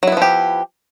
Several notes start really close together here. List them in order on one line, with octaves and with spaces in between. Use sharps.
F#3 E4 B3 F3 G4